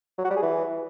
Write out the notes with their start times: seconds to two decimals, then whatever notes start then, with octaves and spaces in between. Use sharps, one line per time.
0.18 F#3
0.24 F#4
0.30 G3
0.36 G#4
0.42 E3